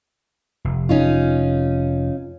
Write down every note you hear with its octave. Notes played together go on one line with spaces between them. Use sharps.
F1
C#4 D#4 F4